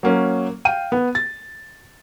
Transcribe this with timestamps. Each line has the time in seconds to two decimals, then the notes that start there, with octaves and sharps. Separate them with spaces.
0.03 F#3 A#3 C#4
0.65 F5 G5 D#7
0.92 B3
1.15 A6